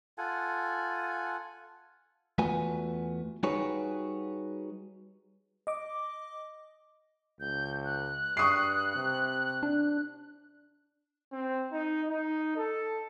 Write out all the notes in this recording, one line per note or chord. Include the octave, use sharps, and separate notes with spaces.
F4 A4 F#5 G#5
E2 A3 F4 F#4 B4 G#5
G3 D#4 F#4 G#4 B4 C#5
D#5 D6
C#2 G6
F#6
G2 C#6 D#6 C7
C3
D4
C4
D#4
D#4
A4